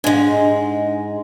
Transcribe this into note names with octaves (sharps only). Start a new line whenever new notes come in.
G#2 G#3 D4 F5